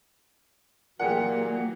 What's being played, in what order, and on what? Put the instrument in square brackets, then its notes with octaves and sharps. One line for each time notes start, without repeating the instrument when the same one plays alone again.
[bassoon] A#2 [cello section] E3 F#3 A#3 [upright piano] G4 G#4 F#5